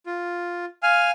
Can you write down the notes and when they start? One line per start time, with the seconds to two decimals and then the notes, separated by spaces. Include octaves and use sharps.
0.06 F4
0.83 F5 G#5 F6